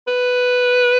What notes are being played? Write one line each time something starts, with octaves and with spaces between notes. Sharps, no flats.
B4